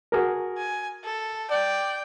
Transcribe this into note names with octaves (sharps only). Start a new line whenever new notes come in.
F#4 G#4 A#4
G#5
A4
D5 G5